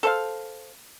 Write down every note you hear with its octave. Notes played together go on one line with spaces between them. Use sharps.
A4 C5 F5